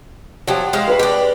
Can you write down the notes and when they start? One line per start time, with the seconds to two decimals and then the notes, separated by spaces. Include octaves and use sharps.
0.47 F3 F#3 G4 A5
0.73 G#3 C5 F5
0.88 B4 B5 C#6
0.99 D4 G4